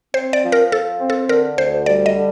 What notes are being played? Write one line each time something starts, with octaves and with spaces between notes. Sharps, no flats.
C4 C5
D5
F3
A#4
F3 A4
C4
A4
D3 A#4
D2 C5
G3 D5
D#5
D3